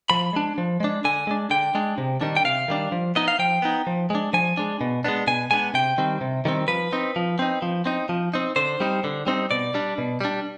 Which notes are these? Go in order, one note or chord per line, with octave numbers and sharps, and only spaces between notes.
F3 B5
G#3 D4
F3
G#3 D4
D3 G#5
G#3 D4
D3 G5
G#3 D4
C3
D#3 G3 D4
G5
C3 F5
D#3 G3 D4
F3
B3 D#4 D#5
F5
F3 G5
B3 D#4
F3
G#3 D4
F3 G#5
G#3 D4
B2
G#3 B3 D4
B2 G#5
G#3 B3 D4 G#5
C3 G5
D#3 G3 C4
C3
D#3 G3 C4
F3 B4
C4 D#4
F3
C4 D#4
F3
C4 D#4
F3
C4 D#4
D3 C5
G3 C4 D#4
D3
G3 C4 D#4
B2 D5
G3 D4
B2
G3 D4